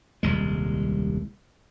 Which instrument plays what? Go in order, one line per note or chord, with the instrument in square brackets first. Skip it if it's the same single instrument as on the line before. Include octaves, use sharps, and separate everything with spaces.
[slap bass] D#1 C2 G#3